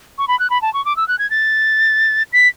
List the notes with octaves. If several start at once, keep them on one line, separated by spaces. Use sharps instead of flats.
C#6
B5
F#6
B5
A5
C#6
D6
E6
F#6
G#6
A6
B6